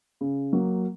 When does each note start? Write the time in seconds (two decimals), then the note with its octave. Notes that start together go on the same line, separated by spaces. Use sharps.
0.21 C#3
0.53 F#3 A#3